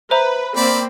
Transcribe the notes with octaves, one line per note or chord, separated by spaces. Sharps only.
B4 C5 E5 A#5
A#3 C4 D5 B5